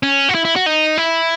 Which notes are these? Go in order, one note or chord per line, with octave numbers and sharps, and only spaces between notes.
C#4
F#4
E4
E4
F#4
D#4
E4